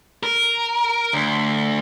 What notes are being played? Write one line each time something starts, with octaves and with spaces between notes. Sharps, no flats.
A#4
D2